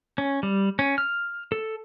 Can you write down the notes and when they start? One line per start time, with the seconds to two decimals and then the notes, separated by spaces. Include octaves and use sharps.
0.18 C#4
0.43 G3
0.79 C#4
0.98 F6
1.52 A4